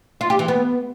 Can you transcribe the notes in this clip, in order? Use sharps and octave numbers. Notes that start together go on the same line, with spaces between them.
F4
G4
E3
B3